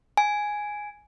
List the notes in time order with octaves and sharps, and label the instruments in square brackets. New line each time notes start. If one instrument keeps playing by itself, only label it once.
[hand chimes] G#5